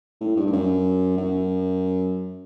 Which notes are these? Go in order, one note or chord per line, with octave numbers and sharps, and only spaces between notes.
A2
G2
G2
F#2
F#2